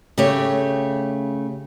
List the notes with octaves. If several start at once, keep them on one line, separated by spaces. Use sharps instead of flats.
C#3 A3 G4 C#5